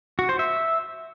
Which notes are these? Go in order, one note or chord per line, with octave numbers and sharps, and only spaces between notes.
F#4
C5
E5